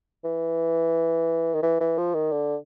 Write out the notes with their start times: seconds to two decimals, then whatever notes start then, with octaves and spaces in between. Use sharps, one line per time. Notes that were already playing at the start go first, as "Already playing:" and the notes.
0.24 E3
1.54 D#3
1.62 E3
1.80 E3
1.98 F3
2.14 D#3
2.32 D3